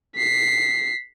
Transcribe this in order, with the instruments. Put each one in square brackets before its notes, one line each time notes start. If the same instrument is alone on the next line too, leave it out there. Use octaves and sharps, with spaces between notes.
[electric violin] B6 C7